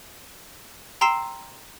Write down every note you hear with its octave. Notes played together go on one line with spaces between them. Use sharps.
G5 A#5 C6 E6 C7 E7